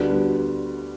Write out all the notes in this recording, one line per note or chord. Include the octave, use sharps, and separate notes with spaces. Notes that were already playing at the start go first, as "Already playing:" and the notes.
Already playing: D2 D3 G3 B3 D4 F#4